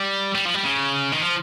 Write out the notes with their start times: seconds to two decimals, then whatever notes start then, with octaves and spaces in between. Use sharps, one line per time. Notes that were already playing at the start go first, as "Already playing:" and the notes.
Already playing: G3
0.35 G3
0.46 F3
0.55 G3
0.64 C#3
1.12 D#3
1.22 F3